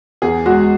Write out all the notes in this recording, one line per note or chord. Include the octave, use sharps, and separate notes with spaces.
E2 G#4
G#3 F#4